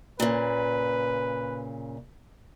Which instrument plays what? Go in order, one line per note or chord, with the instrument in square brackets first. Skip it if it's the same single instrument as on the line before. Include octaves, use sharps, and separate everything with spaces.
[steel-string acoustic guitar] A#2 C#3 [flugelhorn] B4